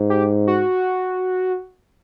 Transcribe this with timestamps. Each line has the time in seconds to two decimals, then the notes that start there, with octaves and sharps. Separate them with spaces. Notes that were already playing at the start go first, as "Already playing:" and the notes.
Already playing: G#2
0.10 G4
0.48 F#4